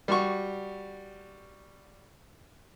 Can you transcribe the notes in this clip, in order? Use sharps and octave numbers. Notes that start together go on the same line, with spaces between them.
G3 F#4 C#6